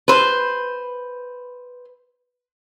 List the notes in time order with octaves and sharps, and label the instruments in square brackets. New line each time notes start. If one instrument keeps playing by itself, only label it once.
[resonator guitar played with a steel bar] B4 C5